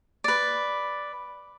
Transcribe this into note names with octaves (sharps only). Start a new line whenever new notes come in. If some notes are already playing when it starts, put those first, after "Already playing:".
B4 D5